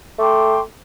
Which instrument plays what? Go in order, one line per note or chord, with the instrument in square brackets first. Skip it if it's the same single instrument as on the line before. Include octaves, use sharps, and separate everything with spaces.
[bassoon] A3 [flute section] G5 C6 D6